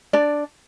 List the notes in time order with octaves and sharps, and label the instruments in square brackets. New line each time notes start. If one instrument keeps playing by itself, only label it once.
[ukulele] D4 D5